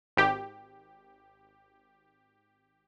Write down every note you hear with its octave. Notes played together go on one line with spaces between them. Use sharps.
G#1 G4